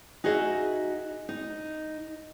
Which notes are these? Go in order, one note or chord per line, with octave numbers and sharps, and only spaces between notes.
D#4 F#4 G#4 D#5 E5
D#4